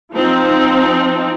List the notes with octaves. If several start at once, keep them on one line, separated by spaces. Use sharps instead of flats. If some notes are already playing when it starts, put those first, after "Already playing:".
F3 C4 D#4